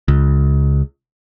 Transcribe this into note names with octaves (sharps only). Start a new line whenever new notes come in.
C#2